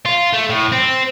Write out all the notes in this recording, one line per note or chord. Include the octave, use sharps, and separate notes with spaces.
F4
A3
A2
C4